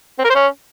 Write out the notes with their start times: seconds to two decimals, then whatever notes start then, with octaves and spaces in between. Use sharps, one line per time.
0.19 C4
0.24 A#4
0.30 C5
0.35 C#4